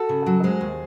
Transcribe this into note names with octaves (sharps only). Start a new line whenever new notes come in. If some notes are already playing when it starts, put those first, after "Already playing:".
Already playing: F#4 A4
C#3
F#3
G#3 G#4 C5
D#2